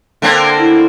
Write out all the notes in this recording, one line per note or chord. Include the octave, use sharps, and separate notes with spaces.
D3 A#3 C4
E4